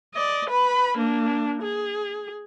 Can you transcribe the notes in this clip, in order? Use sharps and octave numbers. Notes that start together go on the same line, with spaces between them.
D5 D#5
B4 B5
A#3 D4
G#4